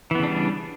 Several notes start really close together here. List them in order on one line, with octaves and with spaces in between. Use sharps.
E3 B3 C#3 D4 G3